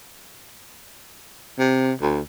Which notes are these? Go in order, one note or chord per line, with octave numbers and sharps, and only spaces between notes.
C3
D2